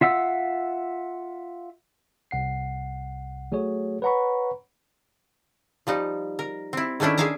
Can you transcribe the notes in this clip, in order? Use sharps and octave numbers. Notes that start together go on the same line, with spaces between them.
F4 E5 F#5 E6
C2 F#5 C7
F#3 A3 F#4 G#4 C#5
B4 C#5 F#5 A#5 B5 C#6
F3 G3 D#4
A#4
C4 E4
D#3 A3 C#4 D4 E4
G#4 A#4 E5 F5 G#5 A#5